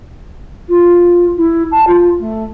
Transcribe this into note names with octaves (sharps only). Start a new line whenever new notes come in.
F4
E4
A5
F4
A3